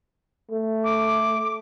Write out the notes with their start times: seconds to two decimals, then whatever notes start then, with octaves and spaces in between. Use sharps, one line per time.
0.51 A3
0.84 D6